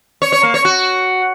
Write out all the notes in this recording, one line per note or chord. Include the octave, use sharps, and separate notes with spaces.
C#5
C#5
A#3
C#5
F#4